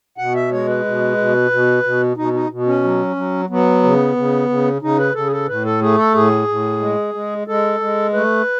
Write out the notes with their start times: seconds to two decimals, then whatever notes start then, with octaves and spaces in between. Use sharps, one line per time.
0.18 B2 F#5
0.35 E5
0.52 G#3 C#5
0.68 B4
0.85 B2
1.17 B2
1.51 B2
1.83 B2
2.17 B2 D#4
2.33 D#4
2.50 B2
2.67 C#4
2.83 F#3
3.16 F#3
3.49 F#3 B3
3.83 C#3
4.16 C#3
4.49 C#3
4.82 C#3 D#4
4.98 B4
5.15 C#3 A4
5.27 G#4
5.32 A4
5.48 A2 B4
5.65 A4
5.81 A3 G#4
5.98 A4
6.14 A2 G#4
6.48 A2
6.81 G#3
7.14 G#3
7.48 G#3 A4
7.80 G#3
8.13 A3 B4